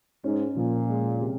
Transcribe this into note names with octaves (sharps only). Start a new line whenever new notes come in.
G#2 C#4
A#2 F3
G#3
C3